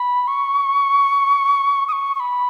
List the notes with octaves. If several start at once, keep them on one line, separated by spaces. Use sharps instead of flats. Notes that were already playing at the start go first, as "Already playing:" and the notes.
Already playing: B5
C#6
D#6
C#6
C#6
B5